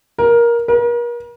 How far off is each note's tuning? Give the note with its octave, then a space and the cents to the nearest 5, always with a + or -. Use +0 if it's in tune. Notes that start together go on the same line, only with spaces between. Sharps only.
A#4 +15
A#4 +40